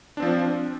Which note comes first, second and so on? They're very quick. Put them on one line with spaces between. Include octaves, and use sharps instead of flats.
D4 C4 F3